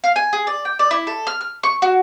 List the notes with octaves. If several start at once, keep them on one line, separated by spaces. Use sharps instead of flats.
F5
G#5
G#4
D5
G5
D5
E4
A4
F6
F6
C#6
F#4